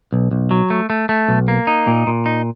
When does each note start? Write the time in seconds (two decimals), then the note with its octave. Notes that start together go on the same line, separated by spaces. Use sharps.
0.13 B1
0.31 B1
0.51 F#3
0.70 A3
0.90 A3
1.09 A3
1.28 B1
1.48 A#3
1.67 D#4
1.87 A#2
2.07 A#2
2.26 D#4